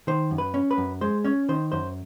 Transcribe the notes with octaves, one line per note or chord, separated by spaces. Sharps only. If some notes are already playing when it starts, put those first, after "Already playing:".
D#3 C5
F#2
B4
C#4
B4
F#2
G#3 C5
C#4 C#5
D#3 C5
F#2 C5